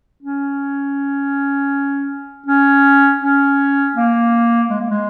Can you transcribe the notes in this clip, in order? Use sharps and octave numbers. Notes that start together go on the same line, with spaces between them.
C#4
C#4
C#4
A#3
G#3
A#3
G#3